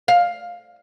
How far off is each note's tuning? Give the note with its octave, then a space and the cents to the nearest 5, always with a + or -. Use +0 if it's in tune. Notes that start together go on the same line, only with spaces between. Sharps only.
F5 +10